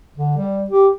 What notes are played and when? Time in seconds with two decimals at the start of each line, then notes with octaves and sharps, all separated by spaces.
0.18 D3
0.37 G3
0.70 G4